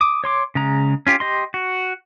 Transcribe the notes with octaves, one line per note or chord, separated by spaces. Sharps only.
D6 D#6
C#5 C6 D6
C#3 G#3 A#5
C#4 F4 G4
G4 D#5 C6
F#4